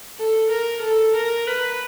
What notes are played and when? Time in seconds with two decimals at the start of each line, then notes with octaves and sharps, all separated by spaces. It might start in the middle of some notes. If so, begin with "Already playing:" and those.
0.18 A4
0.51 A#4
0.82 A4
1.15 A#4
1.47 B4